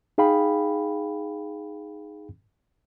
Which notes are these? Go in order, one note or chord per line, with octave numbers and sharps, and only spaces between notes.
D#4 G#4 F5 G5 B5